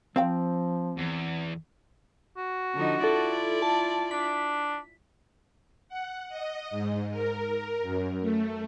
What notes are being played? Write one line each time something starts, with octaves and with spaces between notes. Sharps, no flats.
F3 C4 C5 F5 G5
E2
F#4
D3 F3 D#4
E4 F4 A4 D5
A5
D4 B6
F#5
D#5
G#2
A#4
F#2
A3